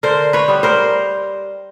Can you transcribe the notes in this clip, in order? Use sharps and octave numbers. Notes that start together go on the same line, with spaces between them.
D3 A#4 C5
B4 C#5
G3 B3
A#4 C5